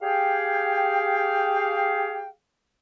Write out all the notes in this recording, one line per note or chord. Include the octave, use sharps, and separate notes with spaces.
G4 G#4 F5 G5